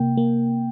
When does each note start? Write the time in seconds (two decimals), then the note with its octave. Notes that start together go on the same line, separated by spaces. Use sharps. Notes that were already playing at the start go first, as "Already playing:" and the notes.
Already playing: C3 A#3 G5
0.17 A#3